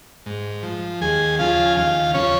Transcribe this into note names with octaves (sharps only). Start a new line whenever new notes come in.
G#2
F3
D#2 G#4 G#5
C#3 F3 F4 F5
G#5
D#2 F4 F5
C#3 F3 C#4 C#5